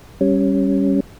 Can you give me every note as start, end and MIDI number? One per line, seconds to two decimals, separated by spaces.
0.21 1.00 55
0.21 1.00 61